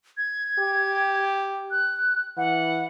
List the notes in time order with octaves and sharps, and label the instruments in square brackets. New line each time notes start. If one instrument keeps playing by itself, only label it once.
[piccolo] G#6
[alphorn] G4
[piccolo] F#6
[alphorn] E3 [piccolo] F#5